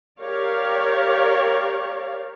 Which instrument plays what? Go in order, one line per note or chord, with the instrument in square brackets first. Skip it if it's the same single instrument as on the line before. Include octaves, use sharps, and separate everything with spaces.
[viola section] G4 A#4 C#5 D5 F5